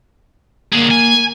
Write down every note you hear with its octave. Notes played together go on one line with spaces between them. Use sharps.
D3 A#3 G#4
G#5